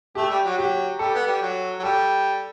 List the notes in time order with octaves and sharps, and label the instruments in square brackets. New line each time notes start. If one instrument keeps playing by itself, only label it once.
[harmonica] A3 [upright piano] G4
[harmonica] G3
F#3
[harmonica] F#3 [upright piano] G4
[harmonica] G3 [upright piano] A4
[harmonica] B3
G3
F#3
F#3
[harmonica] G3 [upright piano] A4